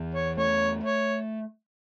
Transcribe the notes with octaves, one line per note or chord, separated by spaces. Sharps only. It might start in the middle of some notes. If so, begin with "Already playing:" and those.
Already playing: E2 E3
C#5
A3 C#5
C#5